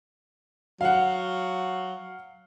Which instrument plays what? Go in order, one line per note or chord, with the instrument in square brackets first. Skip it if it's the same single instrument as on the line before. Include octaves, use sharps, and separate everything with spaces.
[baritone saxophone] F#3 [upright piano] F5 F#5